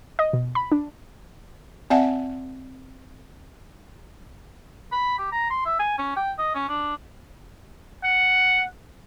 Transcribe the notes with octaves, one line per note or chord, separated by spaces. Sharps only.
D#5
B2
B5
D4
C4 D5 E5 F#5 A5
B5
G4
A#5
C6
E5
G#5
C#4
G5
D#5
C#4
D4
F#5